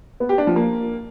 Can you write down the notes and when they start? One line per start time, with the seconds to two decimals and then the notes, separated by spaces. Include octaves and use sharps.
0.20 B3
0.29 G4
0.38 D4
0.47 F3
0.56 A#3